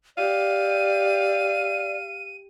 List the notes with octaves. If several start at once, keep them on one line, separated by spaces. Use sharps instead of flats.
G4 D5 F5 D#7